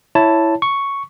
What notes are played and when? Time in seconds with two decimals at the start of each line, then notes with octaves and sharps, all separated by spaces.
0.15 E4 C#5 A5
0.62 C#6